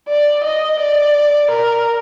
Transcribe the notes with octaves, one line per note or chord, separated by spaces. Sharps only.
D5
D#5
D5
A#4